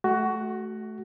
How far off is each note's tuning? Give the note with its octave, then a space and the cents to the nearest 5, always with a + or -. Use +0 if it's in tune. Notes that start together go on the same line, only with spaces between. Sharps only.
A3 -20 F#4 +15